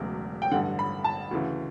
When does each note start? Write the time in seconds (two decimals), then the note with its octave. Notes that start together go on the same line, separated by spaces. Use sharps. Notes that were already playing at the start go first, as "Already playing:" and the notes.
Already playing: E1 E2 C#3 F#3 A3
0.42 G5
0.51 A1 G2 D3 F#5
0.79 B5
1.04 A5
1.31 D2 C#3 E3